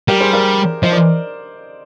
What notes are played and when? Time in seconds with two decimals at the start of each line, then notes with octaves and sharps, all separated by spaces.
0.08 G3 G4 A#4
0.21 G#4 C5
0.33 A#4 D5
0.83 F3 C5 D#5
0.92 A#4 D5